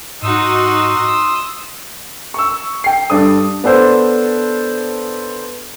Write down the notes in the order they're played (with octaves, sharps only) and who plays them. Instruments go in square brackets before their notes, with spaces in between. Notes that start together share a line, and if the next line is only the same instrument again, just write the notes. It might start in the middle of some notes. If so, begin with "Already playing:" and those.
[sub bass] G#2 [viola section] D#4 F#4 [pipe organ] C6 D#6 E6
[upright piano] C#6 E6
G5 C7
G2 D4 A4 D#6
[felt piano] B3 D4 A4 C5